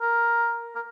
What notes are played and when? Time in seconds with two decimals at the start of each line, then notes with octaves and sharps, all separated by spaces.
0.01 A#4
0.75 A#4